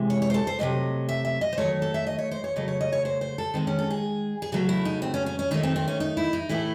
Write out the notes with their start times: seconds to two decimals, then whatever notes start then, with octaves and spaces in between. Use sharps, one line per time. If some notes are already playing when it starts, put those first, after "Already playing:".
Already playing: C3 E3 G#3
0.10 C#5
0.22 C#5
0.30 C5
0.34 A4
0.47 C5
0.59 C3 F#3 A3 D#5
1.09 E5
1.25 E5
1.41 D#5
1.53 C5
1.58 D#3 F#3 A3 C#5
1.82 A4
1.94 E5
2.07 D#5
2.19 C#5
2.31 C5
2.44 C#5
2.56 C#3 F#3 A3 D#5
2.68 C#5
2.81 D#5
2.92 C#5
3.05 C5
3.21 C5
3.38 A4
3.54 D#3 G#3 C4
3.67 C#4
3.79 A4
3.90 G#4
4.42 G#4
4.52 C#3 F#3 A3 F#4
4.69 E4
4.85 D#4
5.02 C4
5.14 C#4
5.26 C#4
5.39 C#4
5.51 D#3 A3 D#4
5.63 C4
5.76 C4
5.88 C#4
6.00 D#4
6.17 E4
6.33 D#4
6.49 A2 E3 A3 E4